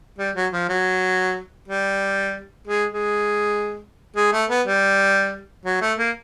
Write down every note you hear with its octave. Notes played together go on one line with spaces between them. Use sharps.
G3
F#3
F3
F#3
G3
G#3
G#3
G#3
A3
B3
G3
F#3
A3
A#3